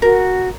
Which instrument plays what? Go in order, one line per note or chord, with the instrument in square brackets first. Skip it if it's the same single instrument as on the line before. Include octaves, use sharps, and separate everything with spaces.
[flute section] F#4 [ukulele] A#4